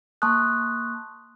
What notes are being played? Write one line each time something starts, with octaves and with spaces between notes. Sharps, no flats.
A#3 A5 C6 C#6 D#6 F#6